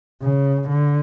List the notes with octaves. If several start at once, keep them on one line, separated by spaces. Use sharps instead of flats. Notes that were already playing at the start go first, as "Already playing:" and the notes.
C#3
D3